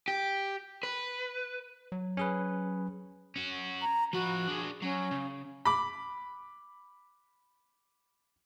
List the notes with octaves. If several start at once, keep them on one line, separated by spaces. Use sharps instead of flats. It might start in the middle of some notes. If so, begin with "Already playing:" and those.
G4
B4
F#3
C#4 G#4 B4
C#4 F#4
A#5
F3 F#4 B5
D4 G#4
F#3 C#4
C#3
B5 D6